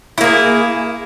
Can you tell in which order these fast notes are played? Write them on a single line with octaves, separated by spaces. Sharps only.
E4 A#3 G#4